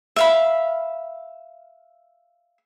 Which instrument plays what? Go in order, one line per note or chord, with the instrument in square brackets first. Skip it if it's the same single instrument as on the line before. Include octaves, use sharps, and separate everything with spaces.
[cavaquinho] E5 F5 B5